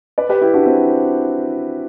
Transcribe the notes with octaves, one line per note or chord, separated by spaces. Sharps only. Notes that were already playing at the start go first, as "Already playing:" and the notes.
B4 D5
G4 B4
E4 G4
D4 F#4
C4 E4